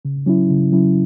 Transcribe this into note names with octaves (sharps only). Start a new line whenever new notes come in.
C#3
F#3 C#4 E4
C#3
F#3 C#4 E4